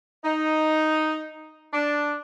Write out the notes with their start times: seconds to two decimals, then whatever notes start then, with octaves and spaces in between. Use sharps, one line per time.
0.24 D#4
1.73 D4